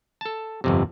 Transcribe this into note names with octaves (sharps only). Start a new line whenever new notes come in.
A4 A5
G1 F2 C3